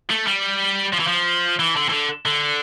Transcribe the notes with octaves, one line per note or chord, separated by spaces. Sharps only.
A3
G3
F3
E3
F3
E3
D3
E3
D3
D3